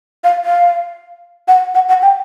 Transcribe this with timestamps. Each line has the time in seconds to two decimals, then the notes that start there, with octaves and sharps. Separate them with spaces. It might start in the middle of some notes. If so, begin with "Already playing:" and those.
0.24 F5
0.45 F5
1.48 F#5
1.75 F#5
1.89 F#5
2.02 G5